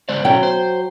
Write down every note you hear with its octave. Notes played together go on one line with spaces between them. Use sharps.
G#3 C5 D5
B2 F#3 B3 C#4 G5
C5